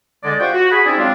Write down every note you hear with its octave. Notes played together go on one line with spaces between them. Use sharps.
D3 G#3 D5
F4 G4 C5 F#5 G5 C#6
F#4
F#4 G#4 B5
C4 C#4 D#4 E4 G#4 D5
F#3 G#3 C4 D4 F4